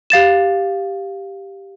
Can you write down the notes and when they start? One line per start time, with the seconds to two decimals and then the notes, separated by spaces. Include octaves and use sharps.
0.10 G4 F5 A6 E7